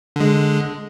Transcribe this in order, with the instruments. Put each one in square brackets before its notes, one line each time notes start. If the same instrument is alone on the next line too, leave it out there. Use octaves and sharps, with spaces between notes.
[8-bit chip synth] D3 G#3